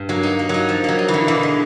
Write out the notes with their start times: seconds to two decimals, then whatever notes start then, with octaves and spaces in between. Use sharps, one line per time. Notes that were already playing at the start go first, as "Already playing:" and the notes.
Already playing: G2
0.09 F#3 A#3
0.23 D#4
0.39 A#3
0.49 F#3 D#4
0.69 F3
0.84 F#3 A#3
0.99 D#4
1.08 E3
1.14 D3
1.28 B2 E3
1.43 G#3